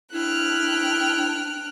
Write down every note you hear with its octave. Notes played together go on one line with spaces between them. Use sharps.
D4 E4 G5 F6 F#6